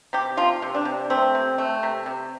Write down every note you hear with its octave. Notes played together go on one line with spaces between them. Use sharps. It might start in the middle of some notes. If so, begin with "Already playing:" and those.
C3 G4
F3 F4
C3
D4
C3
A3 C4
C3
A3
C3
C3